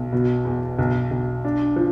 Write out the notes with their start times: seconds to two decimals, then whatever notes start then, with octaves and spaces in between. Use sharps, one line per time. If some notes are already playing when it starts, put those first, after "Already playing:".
Already playing: B1
0.12 B2
0.45 E2
0.79 B1
1.11 B1
1.45 D4
1.76 F3